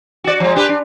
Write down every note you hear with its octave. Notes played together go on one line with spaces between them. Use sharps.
F#4 D5
F3 G#3
D4 G4 B4
D4